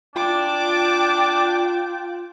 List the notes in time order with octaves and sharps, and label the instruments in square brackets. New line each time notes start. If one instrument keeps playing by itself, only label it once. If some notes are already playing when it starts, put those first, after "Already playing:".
[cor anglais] D4 [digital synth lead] F4 [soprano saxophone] G5 [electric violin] D6